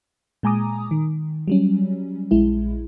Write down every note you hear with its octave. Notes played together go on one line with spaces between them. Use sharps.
A#2 G#3 G#5 A#5 D6 D#6
D#3
F#3 G3 C#4
A#1 G#3 E4